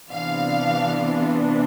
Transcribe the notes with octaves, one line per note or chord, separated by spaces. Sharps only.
C3 E3 B3 D4 F5